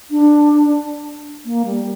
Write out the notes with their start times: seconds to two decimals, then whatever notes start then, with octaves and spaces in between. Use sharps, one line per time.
0.11 D4
1.45 A#3
1.65 G3